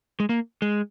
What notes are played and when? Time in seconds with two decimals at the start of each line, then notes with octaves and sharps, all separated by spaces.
0.20 G#3
0.29 A#3
0.62 G#3